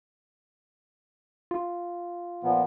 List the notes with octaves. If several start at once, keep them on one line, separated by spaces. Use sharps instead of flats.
F4
A#2 F3 B3